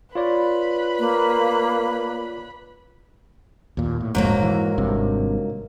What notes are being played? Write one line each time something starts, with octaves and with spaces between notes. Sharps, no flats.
F4 B4 C#5 D5 B5
A#3
D#2 A#2
A2
E1 A#1 F2 G#2 F#3 A#3
E3
G#1 G2 C3